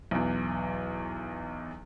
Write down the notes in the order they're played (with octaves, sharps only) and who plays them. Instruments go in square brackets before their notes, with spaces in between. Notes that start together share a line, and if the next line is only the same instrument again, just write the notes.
[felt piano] B1 E2